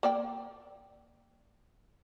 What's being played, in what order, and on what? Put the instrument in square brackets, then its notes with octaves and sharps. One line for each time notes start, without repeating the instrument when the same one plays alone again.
[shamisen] A#3 D5 G5